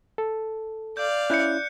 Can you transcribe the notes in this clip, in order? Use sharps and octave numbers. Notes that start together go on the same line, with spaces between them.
A4
D5 F5 G6
C#4 E4 F#6 G6 C#7